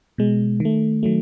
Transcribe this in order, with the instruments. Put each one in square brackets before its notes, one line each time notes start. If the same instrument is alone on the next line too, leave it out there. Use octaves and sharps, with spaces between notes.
[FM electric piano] B2 G#3
D#3 A3
D#3 F#3 A3